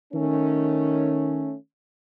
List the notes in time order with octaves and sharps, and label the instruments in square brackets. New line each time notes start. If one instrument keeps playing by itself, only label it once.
[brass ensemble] D#3 A3 C#4